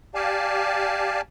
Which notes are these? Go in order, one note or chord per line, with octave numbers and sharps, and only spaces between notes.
G4 D5 F5 G#5 A5